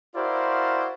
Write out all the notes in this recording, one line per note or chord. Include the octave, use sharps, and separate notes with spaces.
E4 F#4 A#4 C5 D5 F5